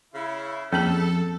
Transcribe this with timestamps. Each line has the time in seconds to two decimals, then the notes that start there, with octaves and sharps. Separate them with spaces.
0.15 C#3 E4
0.73 F2 A#3 C#4 G#4 A4